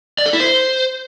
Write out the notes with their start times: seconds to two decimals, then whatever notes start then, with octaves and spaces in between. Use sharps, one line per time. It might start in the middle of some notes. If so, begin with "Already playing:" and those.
0.18 D5
0.26 A4
0.33 E4
0.40 C5